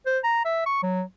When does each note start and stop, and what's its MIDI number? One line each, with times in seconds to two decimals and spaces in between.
0.06 0.19 72
0.24 0.42 82
0.45 0.63 76
0.66 0.81 85
0.83 1.02 54